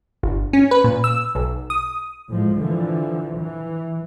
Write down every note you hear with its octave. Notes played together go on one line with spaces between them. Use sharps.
G1
C#4
B4
A#2
E6
B1
D#6
A2 F3 G#3
D3 E3 F3
E3